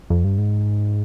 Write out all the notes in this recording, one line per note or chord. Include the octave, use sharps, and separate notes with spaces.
F2
G2
G#2